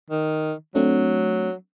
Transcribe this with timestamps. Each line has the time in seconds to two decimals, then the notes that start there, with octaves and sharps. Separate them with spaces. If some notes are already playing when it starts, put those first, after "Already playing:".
0.10 D#3
0.75 F#3 A3 C4 D4